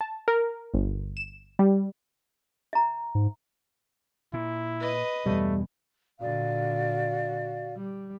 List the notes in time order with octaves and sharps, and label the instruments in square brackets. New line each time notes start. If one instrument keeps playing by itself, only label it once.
[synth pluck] A5
A#4
G1
E7
G3
[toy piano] E5 A#5
[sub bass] G#2
[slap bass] A#2 [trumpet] E4
[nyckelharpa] B4 D#5
[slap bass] E2 G2 B2 [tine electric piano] G3 [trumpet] A3
[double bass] A#2 D3 [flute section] F#4 D5 F5
[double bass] G3